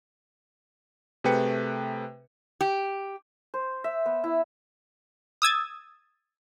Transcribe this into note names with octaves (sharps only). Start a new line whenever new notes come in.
C3 A3 G#4 B4 G5 C#7
G4
C5
E5
B3
E4
D#6 E6 G#6 A6